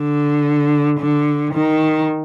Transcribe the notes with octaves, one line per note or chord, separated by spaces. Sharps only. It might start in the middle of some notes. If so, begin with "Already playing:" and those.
Already playing: D3
D3
D#3